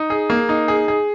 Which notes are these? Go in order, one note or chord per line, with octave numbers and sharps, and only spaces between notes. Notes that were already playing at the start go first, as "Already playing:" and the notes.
Already playing: D#4
G#4
A#3
D#4
G#4
G#4